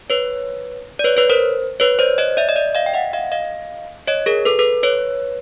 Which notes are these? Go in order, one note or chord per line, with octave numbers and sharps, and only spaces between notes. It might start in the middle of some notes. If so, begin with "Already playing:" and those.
B4 C#5
D5
B4 C#5
B4 C#5
A#4 C5
B4 C#5
C5 D5
C#5 D#5
D5 E5
D#5
D5 E5
D#5 F5
G5
E5 F#5
D#5 F5
D#5 F5
C#5 D#5
G#4 A#4
A4 B4
A4 B4
B4 C#5